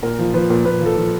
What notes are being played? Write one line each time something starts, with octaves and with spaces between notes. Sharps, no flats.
A#2 A#4
F3
F3 B4
A#2
A#2 B4
F3 A4
F3